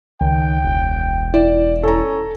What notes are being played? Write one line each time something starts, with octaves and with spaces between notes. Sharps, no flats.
C#2 D#3 G5
E1
E4 D5
C#4 A4 A#5